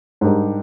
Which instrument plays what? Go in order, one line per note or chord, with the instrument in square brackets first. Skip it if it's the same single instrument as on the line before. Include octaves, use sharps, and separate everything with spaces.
[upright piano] G#2 G3 D4 G4 A#4